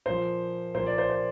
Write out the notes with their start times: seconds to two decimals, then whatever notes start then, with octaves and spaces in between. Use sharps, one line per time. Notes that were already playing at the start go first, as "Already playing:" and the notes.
0.06 A#2 F3 C5
0.75 A#2 C5
0.79 F3
0.86 D5
0.98 C5
1.10 C5